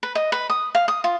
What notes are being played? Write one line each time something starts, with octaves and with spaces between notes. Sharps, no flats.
B4
D#5
B4
D#6
F5
D#6
F4